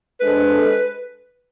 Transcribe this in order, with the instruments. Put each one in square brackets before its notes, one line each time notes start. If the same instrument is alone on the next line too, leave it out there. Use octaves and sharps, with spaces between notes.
[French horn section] G#3 D4 A4 C5 [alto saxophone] B4